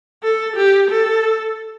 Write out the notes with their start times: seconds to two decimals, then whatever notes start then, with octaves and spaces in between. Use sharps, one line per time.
0.23 A4
0.56 G4
0.90 A4